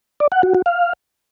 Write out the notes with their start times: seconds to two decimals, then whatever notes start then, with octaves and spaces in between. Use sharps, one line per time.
0.20 D5
0.32 F#5
0.43 F#4
0.55 F#4
0.66 F5